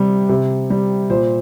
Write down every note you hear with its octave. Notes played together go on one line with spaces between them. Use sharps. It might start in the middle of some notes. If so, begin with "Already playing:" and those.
Already playing: C3 G3
C3
G3
A#2 C5